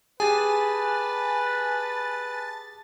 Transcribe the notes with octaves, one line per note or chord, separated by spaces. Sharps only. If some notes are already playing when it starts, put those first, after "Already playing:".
G4 G#4 B4 G#5 A5 A6